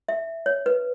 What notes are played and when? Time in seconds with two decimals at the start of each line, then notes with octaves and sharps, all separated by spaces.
0.08 E5
0.46 C#5
0.66 B4